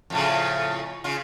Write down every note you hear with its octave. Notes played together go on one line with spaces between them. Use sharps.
F2 A2 C#3
C#3 F4